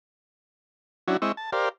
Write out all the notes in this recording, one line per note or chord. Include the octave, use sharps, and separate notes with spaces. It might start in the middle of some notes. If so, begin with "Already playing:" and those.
F#3 C#4 D4 E4 F#4
G#3 C4 E4 D#5 C#6 E6
A5
G4 A#4 C5 D5 F5